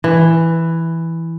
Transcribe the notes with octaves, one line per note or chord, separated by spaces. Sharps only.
E3